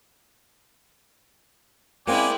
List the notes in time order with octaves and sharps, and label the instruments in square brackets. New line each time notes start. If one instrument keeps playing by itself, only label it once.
[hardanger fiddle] G#3 E4 [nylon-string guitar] A#3 C4 C#4 [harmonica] D5 G#5 [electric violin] G5